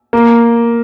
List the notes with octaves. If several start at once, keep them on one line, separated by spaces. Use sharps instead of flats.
A#3